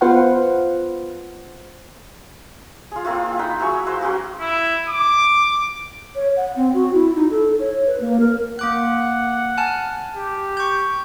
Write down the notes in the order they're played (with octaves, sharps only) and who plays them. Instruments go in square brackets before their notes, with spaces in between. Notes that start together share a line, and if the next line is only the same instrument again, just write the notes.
[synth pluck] B3 F4 B4 C5 F5 F#5
[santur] F4 G#4
A#3 C4 E4 F4
D#4 F#5 B5
F#3 E4 G#4 C#6
F#4 B4 C5 F5
F#3 C#4 F#4 G#4
[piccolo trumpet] E4
D6
[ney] C#5
F#5
C4
F#4
E4
D#4
A4
C#5
B4
A#3
A#4
[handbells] A#3 D6 F#6 [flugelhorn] F#5
[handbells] G#5 A5 F6
[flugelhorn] G4
[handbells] C#6 G6